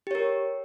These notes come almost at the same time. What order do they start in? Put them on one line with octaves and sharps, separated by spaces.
G4 C#5 A#4